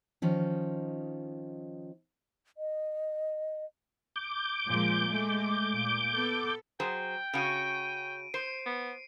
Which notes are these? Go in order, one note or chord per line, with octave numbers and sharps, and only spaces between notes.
D#3 F3 C#4 D#4
D#5
D6 G6
A#2 F3 G#3
G#3 A3
A#2
B3 A4
F#3 G#4 C5 G5
C#3 C#4 F#4 D7 D#7
C5 C7
B3